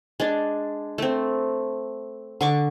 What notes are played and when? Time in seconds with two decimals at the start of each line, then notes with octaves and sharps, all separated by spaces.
0.20 G#3 D4
0.98 A3 C4
2.41 D3 C#6 D6